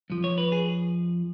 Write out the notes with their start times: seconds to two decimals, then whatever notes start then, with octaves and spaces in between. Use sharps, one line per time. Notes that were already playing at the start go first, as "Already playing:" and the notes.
0.10 F2 F3
0.24 C#5
0.38 B4
0.52 G#4